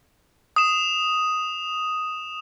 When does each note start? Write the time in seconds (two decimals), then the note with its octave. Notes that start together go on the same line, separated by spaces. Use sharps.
0.56 D#6 E7